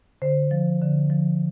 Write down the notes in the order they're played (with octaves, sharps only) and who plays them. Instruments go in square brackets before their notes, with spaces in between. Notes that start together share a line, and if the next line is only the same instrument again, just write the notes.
[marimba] D3 C5
F3
D3
F3